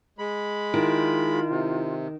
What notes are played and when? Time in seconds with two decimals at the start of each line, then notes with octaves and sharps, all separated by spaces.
0.19 G#3 B5
0.74 D#3 E4 F4
1.49 C3